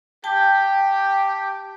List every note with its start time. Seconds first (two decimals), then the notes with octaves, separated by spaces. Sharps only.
0.24 G4 G5 A5